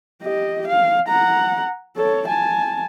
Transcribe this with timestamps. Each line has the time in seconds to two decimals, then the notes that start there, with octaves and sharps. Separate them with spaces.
0.22 G4 D#5
0.67 F5
1.08 F#5 A#5
1.97 A4 C#5
2.28 G#5 A5